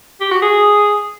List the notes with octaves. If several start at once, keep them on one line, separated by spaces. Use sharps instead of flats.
G4
F#4
G#4